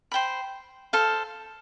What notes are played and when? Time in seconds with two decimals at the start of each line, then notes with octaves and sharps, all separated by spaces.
0.11 C5 G5 B5
0.93 A4 C5 F5